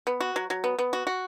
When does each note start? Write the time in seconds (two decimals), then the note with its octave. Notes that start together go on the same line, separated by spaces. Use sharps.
0.07 B3
0.20 F#4
0.36 F#3
0.50 F#3
0.64 B3
0.78 B3
0.93 F#4
1.07 F#4